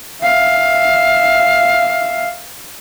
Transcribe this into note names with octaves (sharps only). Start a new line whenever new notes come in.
E5 F5